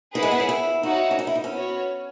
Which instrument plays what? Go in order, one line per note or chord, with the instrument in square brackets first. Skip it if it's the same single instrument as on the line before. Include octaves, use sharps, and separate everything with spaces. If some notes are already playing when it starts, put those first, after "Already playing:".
[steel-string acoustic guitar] D#4 [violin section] E4 G#4 B4 F#5
[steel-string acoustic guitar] G#3
B3
C#4
E4
[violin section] D#4 F#4 C#5 F#5 [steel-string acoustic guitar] E4
[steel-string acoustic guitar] C#4
D#4
E4
D#4
C#4
[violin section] B3 F#4 C#5